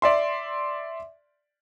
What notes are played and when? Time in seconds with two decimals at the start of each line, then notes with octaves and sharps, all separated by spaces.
0.02 D5 E5 C6